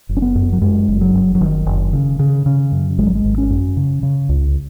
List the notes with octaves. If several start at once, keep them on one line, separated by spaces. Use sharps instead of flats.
F#1
C#4
B3
F#2
F#3
F#2 G#3
F#1
F#3
F#1
F#3
F#1 D#3
F#1
C#3
C#3
C#3
F#2
G#1 G#3
F#3
G#3
G#1
C#4
F#2
C#3
C#3
C#2